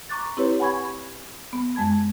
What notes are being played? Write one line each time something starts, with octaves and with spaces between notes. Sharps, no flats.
A#5 C#6 D6 F#6 A6
C4 E4 G4 B4 C#5
F#5 G#5 B5 C#6 G#6
B3
F#2 G#3 A5 G#6